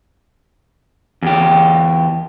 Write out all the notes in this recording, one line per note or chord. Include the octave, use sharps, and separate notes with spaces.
E2 G4